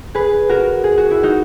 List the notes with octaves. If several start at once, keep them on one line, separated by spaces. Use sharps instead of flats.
G#4 B4
F#4 A#4
G#4
F#4
E4
D#4 F#4